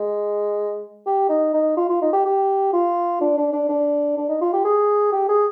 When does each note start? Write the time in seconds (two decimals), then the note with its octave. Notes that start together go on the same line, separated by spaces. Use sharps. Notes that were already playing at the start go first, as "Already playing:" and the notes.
Already playing: G#3
1.06 G4
1.29 D#4
1.54 D#4
1.77 F4
1.89 F4
2.02 D#4
2.13 G4
2.26 G4
2.73 F4
3.21 D4
3.37 D4
3.53 D4
3.69 D4
4.17 D4
4.29 D#4
4.41 F4
4.53 G4
4.65 G#4
5.13 G4
5.29 G#4